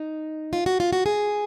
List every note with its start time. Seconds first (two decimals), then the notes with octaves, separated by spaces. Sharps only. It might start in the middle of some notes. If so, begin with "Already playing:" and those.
Already playing: D#4
0.53 F4
0.66 F#4
0.80 F4
0.93 F#4
1.06 G#4